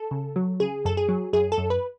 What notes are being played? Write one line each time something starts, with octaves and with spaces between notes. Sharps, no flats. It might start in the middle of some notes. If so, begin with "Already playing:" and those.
Already playing: A4
C#3
F#3
C#3 G#4
F#2 A4
G#4
F#3
F#2 G#4
A4
F#2
B4